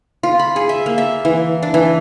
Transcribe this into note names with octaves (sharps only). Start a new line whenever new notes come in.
F4
B5
G#4
E5
A#3
E5
E3
D4
E3